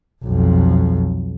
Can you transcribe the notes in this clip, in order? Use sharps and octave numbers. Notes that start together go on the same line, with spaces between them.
B1 F2